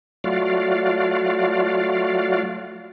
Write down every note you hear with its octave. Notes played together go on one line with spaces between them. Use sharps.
F#3 A3 F4 F#4 D5 F5